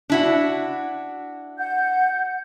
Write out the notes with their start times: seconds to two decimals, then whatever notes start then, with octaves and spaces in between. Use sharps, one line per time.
0.10 D4 E4 F#4
1.57 F#5 G6